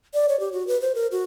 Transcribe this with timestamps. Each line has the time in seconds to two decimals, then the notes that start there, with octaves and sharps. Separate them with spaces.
0.14 D5
0.29 C#5
0.40 G4
0.52 F#4
0.68 B4
0.81 C5
0.95 A#4
1.12 F#4